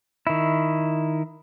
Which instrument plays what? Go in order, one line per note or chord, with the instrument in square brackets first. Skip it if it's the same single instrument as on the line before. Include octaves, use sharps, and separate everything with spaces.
[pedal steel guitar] D#3 E4